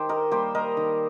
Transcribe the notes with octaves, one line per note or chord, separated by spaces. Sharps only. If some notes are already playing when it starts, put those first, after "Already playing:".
Already playing: D#3 G4 C5
A#4 D#5
G3 A#3 G4 C5
A#4 D#5
D#3